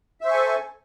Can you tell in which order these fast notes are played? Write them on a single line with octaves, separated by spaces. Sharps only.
E5 C5 C#6 G#5 A4